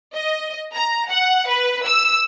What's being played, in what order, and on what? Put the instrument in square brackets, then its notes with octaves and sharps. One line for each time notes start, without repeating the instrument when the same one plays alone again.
[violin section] D#5
A#5
F#5
B4
E6